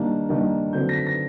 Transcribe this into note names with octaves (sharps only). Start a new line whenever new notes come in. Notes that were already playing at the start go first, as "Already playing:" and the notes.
Already playing: D#3 G3 A#3 D4
D#3 G3 A#3 D4
D3 F#3 A3 C4 G6
A#6
B6
A#6